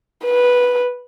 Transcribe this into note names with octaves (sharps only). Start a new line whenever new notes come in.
B4